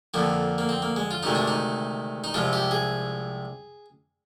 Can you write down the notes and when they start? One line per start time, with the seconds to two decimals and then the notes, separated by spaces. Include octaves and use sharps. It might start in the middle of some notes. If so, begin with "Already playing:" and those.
0.14 F2 D3 F3 A#3
0.58 A#3
0.69 C4
0.82 A#3
0.96 G#3
1.11 F4
1.23 D2 C3 D#3 G#3 D#4
1.35 D4
1.48 D#4
2.24 D#4
2.34 C2 C3 F3 G#3 F4
2.53 G4
2.71 G#4